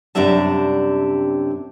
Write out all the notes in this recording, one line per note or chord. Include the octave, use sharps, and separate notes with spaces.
F#2 C3 G3 D4 E5 A5